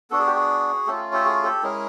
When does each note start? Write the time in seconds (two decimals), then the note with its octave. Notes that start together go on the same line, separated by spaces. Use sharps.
0.11 B3 D4 F#4 A4
0.19 G#4
0.27 G4
0.36 F#4 G#4
0.87 A3 C#4 F4 G4 A4
1.12 G4 A4
1.24 F#4 G#4
1.44 G4 A4
1.63 G#3 C#4 E4 G#4 A#4